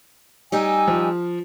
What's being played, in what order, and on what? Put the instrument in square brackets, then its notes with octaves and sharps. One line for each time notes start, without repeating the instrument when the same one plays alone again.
[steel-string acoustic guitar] G3 D#4 G4 [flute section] G#5 E6
[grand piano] F3